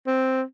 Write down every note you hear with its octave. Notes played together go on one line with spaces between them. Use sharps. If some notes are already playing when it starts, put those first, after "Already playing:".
C4